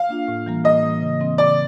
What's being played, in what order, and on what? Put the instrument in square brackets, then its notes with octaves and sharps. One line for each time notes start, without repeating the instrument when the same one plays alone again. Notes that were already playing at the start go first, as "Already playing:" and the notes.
Already playing: [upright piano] F5
[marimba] A#3 D4 F4
A2
E3 G3 A#3
[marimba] A2 [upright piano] D#5
[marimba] E3 G3 A#3
C#3
E3 G3 C4
[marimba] C#3 [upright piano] D5